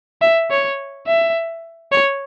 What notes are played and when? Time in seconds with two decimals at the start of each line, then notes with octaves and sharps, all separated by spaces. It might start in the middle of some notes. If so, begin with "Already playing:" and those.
0.22 E5
0.50 C#5
1.07 E5
1.92 C#5